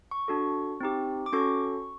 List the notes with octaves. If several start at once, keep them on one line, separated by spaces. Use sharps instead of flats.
C#6
D4 F#4 A4
C4 D#4 G4
D6
C#4 F#4 A4 C#6